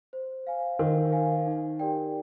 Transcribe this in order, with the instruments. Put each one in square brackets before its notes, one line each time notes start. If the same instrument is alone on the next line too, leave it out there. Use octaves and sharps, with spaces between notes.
[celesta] C5
F5 G#5
[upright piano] D#3 [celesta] C5
[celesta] F5 G#5
D#4
G4 A#4 D5 G5